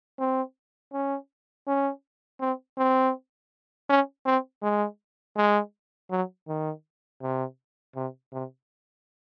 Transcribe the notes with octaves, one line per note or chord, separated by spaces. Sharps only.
C4
C#4
C#4
C4
C4
C#4
C4
G#3
G#3
F#3
D#3
C3
C3
C3